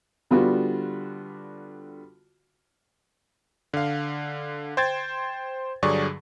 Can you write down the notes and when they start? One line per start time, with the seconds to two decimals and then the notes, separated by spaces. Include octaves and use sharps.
0.30 D3 G3 B3 F4 F#4
3.74 D3 F5
4.77 C5 G5 G#6 A6
5.83 G2 D3 F#3 G#4 D5 C#6